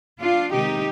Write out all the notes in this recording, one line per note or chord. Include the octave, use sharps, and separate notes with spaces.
D4 F4
C3 D#3 G#3 D#4 G4